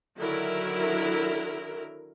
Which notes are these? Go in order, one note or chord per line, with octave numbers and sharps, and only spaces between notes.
D3 D#3 F#3 E4 A#4